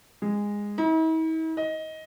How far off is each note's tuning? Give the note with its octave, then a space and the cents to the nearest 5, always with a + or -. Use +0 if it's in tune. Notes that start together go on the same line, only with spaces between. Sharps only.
G#3 -15
E4 -45
D#5 +15